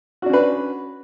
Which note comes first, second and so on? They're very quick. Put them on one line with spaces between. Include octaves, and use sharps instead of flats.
F#4 D4 C#4 B4